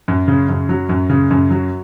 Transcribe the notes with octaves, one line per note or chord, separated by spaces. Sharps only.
F#2
C#3
F#2
F#3
F#2
C#3
F#2
F#3